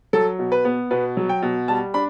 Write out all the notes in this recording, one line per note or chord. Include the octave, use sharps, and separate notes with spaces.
F#3 A4
B2
B4
B3
B2 B4
F#3
G5
B2
G3 A5
D4 B5